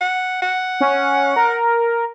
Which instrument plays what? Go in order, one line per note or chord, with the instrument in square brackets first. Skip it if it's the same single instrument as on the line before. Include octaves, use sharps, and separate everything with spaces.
[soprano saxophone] F#5
F#5
[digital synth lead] C#4
A#4